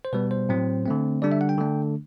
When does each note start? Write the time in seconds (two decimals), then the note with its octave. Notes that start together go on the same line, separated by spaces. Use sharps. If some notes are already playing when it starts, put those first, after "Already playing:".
0.05 C5
0.13 B2 G3 B3 B4
0.31 C5
0.49 A2 F#3 C4
0.86 D3 A3 C4
1.22 D3 G3 D4 D5
1.32 E5
1.41 F#5
1.49 G5
1.58 D3 A3 D4